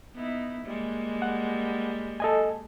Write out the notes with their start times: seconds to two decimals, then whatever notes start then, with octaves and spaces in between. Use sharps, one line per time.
0.15 B3 D#4 E4
0.66 G3 G#3 A#3
1.22 F#5
2.20 A4 D#5 G#5